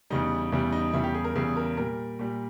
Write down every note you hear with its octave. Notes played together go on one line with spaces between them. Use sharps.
E2 C#3 G3 D#4
E2 C#3 G3 E4
D#4
E2 C#3 G3 E4
G4
G#4
A#4
E2 C#3 G3 G#4
A#4
A#2 G3 A#4
A#2 G3